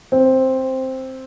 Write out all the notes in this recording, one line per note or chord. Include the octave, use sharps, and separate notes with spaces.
C4